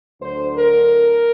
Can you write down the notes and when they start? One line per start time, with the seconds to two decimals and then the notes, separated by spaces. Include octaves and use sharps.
0.21 D2 D3 F#3 C5
0.57 A#4